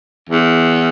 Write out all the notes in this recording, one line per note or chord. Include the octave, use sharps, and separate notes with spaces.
E2